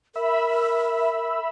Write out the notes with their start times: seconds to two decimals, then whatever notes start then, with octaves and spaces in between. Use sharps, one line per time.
0.16 A#4 E5 B5 E6